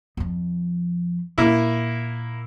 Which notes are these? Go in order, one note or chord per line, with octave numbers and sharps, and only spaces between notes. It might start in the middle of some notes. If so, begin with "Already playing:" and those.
F2 F3
A#2 A#3 E4